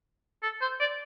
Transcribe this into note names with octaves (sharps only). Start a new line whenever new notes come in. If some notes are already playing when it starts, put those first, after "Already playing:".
A4
C5
D5